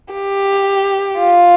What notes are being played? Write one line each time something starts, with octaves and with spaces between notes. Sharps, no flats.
G4
F4